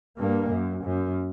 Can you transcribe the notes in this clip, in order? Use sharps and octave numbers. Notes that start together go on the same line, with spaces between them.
G2 A#3
F#2
F#2